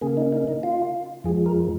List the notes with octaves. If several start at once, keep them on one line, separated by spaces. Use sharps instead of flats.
C#3 A#3 G#4
D#4
D#4
D#4
F4
F2 F3 G#3 G#4
A#4